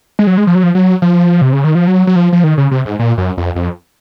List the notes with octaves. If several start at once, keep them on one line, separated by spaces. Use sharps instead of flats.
G#3
F#3
G#3
F3
F#3
F3
F#3
F3
C3
C#3
D#3
F3
F#3
F#3
F3
F3
D#3
C#3
C3
G#2
A#2
F#2
F2
F2